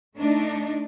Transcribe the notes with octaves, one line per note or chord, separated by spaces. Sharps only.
A3 D4 D#4